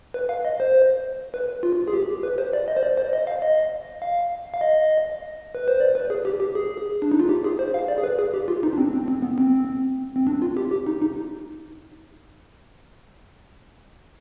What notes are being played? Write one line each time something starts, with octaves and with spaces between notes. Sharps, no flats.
B4
F5
D#5
C5
B4
F4
G#4
G4
B4
C5
D5
D#5
C5
D5
C5
D#5
F5
D#5
F5
F5
D#5
B4
C5
D5
B4
G#4
G4
G4
G#4
D4
D#4
F4
G4
G#4
C5
F5
D5
G#4
B4
G#4
G4
F4
D#4
D4
C4
C4
C4
B3
C4
C4
D4
F4
G4
G4
D#4
D#4